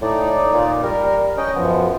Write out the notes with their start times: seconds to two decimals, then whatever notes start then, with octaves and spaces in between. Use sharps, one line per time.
0.01 A2 D#4 D5
0.53 A#2
0.83 G3 A#4
1.37 C#4 D#5 G5
1.55 F#2 F3 B3